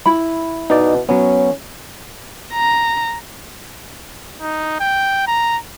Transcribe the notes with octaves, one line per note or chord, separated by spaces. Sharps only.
E4 B5
B2 D#4 D5
F#3 B3 C#4
A#5
D#4
G5
A#5